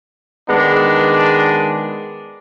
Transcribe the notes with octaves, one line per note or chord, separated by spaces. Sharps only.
D#3 G#3 B3 D4